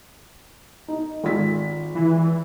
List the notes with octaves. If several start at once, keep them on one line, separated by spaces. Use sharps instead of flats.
D#4
G#1 F4 B6
E3